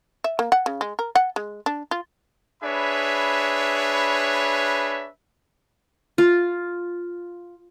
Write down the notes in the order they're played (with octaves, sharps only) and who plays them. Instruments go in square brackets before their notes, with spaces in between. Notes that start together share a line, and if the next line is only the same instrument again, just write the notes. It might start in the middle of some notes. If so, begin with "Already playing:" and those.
[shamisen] E5
A#3
F#5
C#3
G#3
A#4
F#5
G#3
D4
F4
[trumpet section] D4 G#4 B4 C#5 E5 B5
[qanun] F4